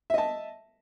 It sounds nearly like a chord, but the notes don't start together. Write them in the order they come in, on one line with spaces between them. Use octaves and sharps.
E5 D#5 A5